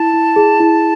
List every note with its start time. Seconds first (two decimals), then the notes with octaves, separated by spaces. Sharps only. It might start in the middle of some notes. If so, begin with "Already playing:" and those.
Already playing: E4 A5
0.14 E4
0.36 G#4
0.60 E4